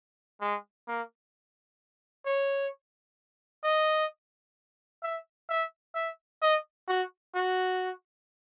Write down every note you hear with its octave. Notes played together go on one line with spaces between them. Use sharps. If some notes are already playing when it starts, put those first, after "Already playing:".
G#3
A#3
C#5
D#5
E5
E5
E5
D#5
F#4
F#4